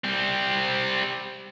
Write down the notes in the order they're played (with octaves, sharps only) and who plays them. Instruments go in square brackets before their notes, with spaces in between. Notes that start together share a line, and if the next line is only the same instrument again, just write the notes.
[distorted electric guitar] G3 C4